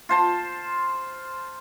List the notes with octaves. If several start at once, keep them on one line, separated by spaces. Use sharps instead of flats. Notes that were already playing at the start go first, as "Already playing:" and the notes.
F4 C5 A5